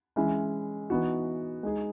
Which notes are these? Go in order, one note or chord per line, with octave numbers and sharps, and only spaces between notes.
E3 G#3 C#4 E4
E3 B3 D#4 F#4
G#3 D#4 G#4